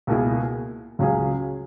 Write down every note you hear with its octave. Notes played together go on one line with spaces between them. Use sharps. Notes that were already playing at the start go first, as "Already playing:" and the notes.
C#2 B2 A#3 E4 G#4
C#2 C#3 F#3 C#4 G#4